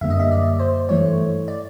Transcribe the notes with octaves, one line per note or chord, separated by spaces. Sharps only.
F#2 D3 G3 A#3 E5
D#5
E5
D5
C5
G2 E3 A3 C#5
D5